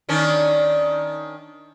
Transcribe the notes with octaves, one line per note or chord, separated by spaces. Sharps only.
D#3 C#4 D4